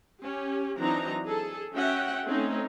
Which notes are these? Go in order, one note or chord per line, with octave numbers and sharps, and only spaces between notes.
C#4 G4
E3 F#3 C4 D4 D#4 A#5
G#4 A4
C#4 F#4 E5 F#5 G5
A3 C4 C#4 D#4